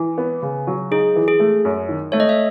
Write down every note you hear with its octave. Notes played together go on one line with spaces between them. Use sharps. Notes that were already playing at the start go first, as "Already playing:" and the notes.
Already playing: E3
B3
C#3
F#3
D#4 G#4
E3
G#4
A3
F#2
D#3
A3 C#5
D#5
E5